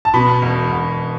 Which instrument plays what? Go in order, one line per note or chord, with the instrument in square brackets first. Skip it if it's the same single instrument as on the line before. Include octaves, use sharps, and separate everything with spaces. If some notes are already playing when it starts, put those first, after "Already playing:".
[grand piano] A5
[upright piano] B2 [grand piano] B5
[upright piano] E1
E1